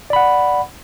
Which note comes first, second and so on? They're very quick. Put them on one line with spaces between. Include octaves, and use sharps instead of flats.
D5 B5 F#5